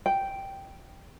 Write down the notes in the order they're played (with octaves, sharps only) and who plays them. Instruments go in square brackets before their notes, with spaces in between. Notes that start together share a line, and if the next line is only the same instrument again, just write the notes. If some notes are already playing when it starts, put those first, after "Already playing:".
[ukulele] G5